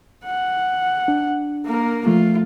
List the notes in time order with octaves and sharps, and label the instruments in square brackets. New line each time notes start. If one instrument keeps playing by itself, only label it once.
[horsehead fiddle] F#5
[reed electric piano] D4
[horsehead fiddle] A#3 A#4
[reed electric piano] F3 A3 [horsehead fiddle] F4